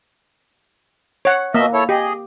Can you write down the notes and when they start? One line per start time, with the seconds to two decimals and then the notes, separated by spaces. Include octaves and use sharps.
1.25 C#5 F#5
1.54 B2 A#3 D#5 E5
1.73 E4 A4 C#5
1.89 G4 G#4 D#5